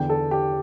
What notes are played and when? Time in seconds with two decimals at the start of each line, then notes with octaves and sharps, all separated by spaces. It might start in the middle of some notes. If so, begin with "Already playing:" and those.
Already playing: E2 D3 G5
0.10 A4
0.31 G4